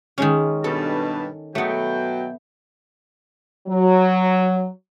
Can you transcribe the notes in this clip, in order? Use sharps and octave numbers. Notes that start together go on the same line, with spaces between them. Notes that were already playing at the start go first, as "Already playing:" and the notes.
D#3 G#3 C#4
G2 B2 A4 A5
B2 F#3 A3 B3 G5
F#3